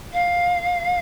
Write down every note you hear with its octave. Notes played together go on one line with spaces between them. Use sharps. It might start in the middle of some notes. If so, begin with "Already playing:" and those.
F5